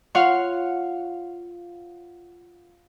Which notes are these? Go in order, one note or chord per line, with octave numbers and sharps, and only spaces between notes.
F4 C#5 F5 F#5 C6 C#6